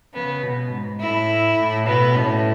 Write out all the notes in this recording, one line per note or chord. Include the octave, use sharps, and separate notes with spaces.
C#3 B3
B2
G#2
A2 E4
A2
B2 B3
A2 C#4